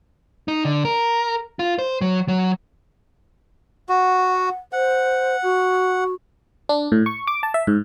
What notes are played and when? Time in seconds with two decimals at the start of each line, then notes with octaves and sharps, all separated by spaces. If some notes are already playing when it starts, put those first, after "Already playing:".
0.48 D#4
0.65 D3
0.85 A#4
1.59 F4
1.78 C5
2.01 F#3
2.28 F#3
3.89 F#4 F#5
4.73 C5 F#5
5.43 F#4
6.69 D4
6.92 A2
7.06 C#6
7.27 D6
7.43 A5
7.54 E5
7.67 G#2